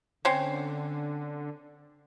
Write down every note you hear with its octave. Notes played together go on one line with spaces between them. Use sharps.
D3 C4 C#4